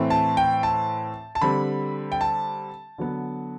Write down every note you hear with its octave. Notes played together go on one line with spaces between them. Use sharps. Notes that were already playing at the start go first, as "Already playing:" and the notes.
Already playing: A2 E3 A3 C4
A5
G5
A5
A5
D3 G3 C4 B5
G5
A5
D3 F#3 B3